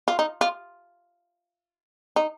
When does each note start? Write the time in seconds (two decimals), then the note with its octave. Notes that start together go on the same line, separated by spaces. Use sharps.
0.08 F4
0.19 D#4
0.41 F4
2.16 D#4